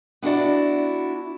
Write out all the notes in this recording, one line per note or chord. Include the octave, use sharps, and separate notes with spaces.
B3 D4 E4 F#4 D5